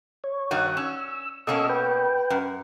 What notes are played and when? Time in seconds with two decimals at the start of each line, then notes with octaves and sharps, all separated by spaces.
0.24 C#5
0.51 G2 D#3 F#4
0.77 C#4 E6
1.47 B2 A#3 C#4 A4 D#5 E6
1.69 B4 G5
2.30 F#2